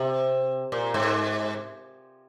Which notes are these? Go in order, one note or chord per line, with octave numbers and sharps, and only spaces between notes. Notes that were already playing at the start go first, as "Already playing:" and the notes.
Already playing: C3
A#2
G#2